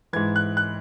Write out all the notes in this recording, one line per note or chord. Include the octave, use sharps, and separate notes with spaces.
G#2 E3 G#6
F#6
F#6